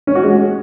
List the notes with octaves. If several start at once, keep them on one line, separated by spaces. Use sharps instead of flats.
C#4
F#4
G#3